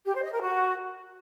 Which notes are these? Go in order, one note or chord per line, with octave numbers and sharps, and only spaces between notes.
G4
C5
D#5
A#4
F#4